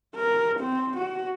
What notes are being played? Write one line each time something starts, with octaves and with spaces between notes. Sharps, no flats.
A#4
C4
F#4